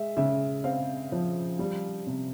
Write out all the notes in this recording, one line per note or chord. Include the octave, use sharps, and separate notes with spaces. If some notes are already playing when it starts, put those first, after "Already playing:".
Already playing: G#3 E5
C#3 E5
C4 F5
F3
G3
C3